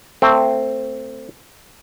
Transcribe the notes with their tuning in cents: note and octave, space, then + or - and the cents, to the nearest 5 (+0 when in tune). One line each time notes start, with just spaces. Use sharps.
A3 +25 C4 +0